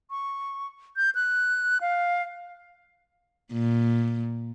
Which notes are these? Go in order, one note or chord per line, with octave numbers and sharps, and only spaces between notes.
C#6
G6
F#6
F5
A#2